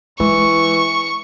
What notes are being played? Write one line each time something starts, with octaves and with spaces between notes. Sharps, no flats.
E3 G#3 C#6